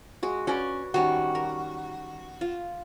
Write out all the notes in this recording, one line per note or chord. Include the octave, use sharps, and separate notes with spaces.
G#3 F#4
C#4 F#4 B4 D5
D#3 G3 C#4 F#4
A#4
F4